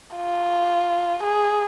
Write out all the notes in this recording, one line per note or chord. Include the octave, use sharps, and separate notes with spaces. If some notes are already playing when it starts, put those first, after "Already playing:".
F4
G#4